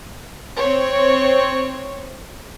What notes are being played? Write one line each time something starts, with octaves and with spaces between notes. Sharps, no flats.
C4 C#5